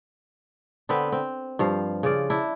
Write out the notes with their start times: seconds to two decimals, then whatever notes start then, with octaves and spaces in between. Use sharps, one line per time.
0.89 D3 B3 C4 B4
1.12 C4
1.59 G2 F3 F5
2.03 C#3 F4 D5
2.30 D4 E4